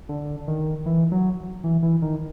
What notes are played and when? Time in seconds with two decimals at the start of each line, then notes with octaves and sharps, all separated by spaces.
0.09 D3
0.48 D#3
0.86 E3
1.12 F#3
1.64 E3
1.82 E3
2.02 D#3